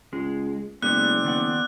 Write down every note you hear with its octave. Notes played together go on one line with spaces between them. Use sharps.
C#2 G#3
F#1 G3 G#3 B3 C4 D5 F#6
D#3 B3 F#5